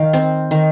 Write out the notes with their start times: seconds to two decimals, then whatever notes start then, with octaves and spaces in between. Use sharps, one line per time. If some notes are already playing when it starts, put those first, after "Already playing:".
Already playing: D#3 F5 G5
0.13 C4
0.51 D#3